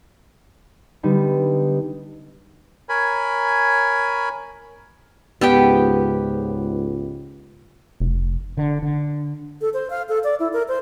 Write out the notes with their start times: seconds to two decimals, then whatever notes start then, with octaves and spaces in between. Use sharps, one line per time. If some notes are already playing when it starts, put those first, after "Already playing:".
1.03 D3 G3 B3 D#4
2.89 A#4 C#5 G#5 B5
5.41 C#2 G#2 B3 G4 G5
8.00 F1
8.57 D3
8.82 D3
9.61 A4
9.74 C5
9.90 F5
10.09 A4
10.24 D5
10.40 E4
10.53 A#4
10.68 C5